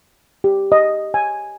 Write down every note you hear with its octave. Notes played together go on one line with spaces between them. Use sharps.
G4
D#5
G#5